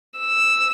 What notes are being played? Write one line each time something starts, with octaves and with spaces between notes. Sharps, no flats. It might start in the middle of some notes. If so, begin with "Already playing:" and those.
E6